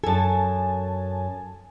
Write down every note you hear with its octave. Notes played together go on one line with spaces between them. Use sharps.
F#2 A4 G#5 A5